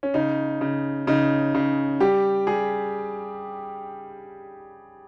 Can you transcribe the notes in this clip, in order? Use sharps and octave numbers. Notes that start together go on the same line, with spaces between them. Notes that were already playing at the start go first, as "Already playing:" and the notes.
C#4
C#3 D#4
C#3
C#3 D#4
C#3
G3 G4
G3 G#4